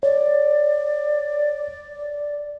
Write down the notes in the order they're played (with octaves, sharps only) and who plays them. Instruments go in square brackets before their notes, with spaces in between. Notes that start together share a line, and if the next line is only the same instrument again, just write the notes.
[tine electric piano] C#5 [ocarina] D5